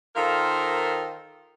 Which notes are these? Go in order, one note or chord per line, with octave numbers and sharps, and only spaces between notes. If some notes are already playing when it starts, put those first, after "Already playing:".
D#3 F4 A4 A#4 C5 F5